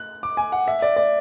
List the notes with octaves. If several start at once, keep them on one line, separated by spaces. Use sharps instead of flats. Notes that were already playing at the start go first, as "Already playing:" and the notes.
Already playing: F#6
D6
G#5
F#5
E5
D5
D5